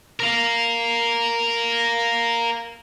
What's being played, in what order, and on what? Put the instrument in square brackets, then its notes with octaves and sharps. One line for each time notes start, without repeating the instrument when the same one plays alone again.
[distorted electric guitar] A#4 F5